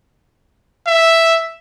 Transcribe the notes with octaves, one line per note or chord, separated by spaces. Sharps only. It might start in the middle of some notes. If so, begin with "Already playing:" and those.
E5